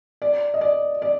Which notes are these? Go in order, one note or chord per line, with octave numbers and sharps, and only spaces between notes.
D5
D#5
D5
D5